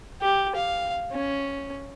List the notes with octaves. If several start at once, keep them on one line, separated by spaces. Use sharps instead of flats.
G4
F5
C#4